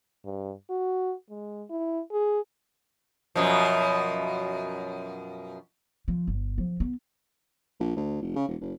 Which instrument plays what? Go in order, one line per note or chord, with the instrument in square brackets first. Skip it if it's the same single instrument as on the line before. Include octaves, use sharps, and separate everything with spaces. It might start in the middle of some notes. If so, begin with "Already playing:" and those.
[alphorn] G2
F#4
G#3
E4
G#4
[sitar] F#2 B2 F3
[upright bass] F3
G1
F3
B3
[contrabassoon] A#1
D2
F1
C#3
E1
F#1